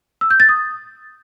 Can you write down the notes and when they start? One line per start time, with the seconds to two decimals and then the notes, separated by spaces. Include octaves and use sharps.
0.21 E6
0.30 G6
0.40 A6
0.49 D#6